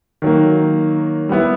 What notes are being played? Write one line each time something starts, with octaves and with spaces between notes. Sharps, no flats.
D#3 F#3 A#3
G3 B3 E4